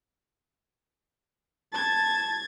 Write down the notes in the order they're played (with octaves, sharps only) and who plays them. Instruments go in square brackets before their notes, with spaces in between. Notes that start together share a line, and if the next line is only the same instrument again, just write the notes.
[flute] A5 [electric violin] G#6 A6